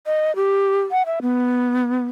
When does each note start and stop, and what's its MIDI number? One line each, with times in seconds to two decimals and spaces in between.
0.07 0.35 75
0.36 0.81 67
0.91 1.05 78
1.06 1.19 76
1.22 2.08 59